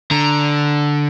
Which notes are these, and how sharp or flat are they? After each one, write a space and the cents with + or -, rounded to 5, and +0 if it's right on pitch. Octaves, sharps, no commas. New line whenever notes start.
D3 +0 A#5 +0